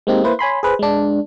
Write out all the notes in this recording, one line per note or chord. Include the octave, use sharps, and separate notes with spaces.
G#3 A#3 C4 D#4 G4
A#3 E4 B4 C5
C#5 G#5 B5 C6
G#4 B4 C5
G#3 D4